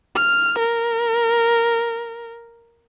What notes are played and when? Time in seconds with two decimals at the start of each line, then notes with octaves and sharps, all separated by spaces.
0.15 F6
0.59 A#4